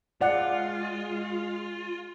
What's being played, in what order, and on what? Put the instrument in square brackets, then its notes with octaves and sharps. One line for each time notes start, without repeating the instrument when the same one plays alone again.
[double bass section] G#3 [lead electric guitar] F4 [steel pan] D5 F#5